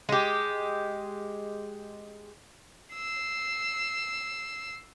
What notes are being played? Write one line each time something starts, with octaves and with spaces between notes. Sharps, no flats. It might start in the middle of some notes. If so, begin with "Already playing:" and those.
G#3 G4
E6 C7